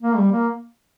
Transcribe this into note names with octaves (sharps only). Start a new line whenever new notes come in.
A#3
G3
A#3